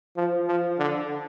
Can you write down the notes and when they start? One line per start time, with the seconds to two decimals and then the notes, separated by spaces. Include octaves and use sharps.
0.17 F3
0.48 F3
0.79 D3